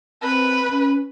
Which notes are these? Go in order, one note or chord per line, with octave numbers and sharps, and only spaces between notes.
C4 B4
C#4